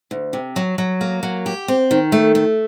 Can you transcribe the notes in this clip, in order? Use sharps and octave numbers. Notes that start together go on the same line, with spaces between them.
D2
C3
F#3
F#3
A#3
F#3
G4
C4
D#3
A3
A3